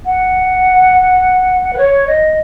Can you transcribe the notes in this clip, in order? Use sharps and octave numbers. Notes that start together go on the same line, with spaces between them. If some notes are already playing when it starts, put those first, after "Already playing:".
F#5
B4
C#5
D#5